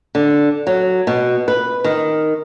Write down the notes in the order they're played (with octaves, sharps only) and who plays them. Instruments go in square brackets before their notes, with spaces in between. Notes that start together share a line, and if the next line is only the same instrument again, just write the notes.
[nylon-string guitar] D3
F#3
B2
B4
D#3